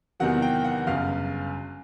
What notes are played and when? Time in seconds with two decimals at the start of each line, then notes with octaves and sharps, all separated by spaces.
0.20 E2 C3 D#3 F#3 F#5
0.42 G5
0.64 F#5
0.87 G1 F#2 C#3 F5